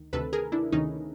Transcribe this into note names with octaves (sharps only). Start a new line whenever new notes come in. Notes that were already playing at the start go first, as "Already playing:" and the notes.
Already playing: D2 D#3
D2 C3 D#3 A4 B4
G#4 A#4
D4 E4
D2 C3 D#3 C#4 D#4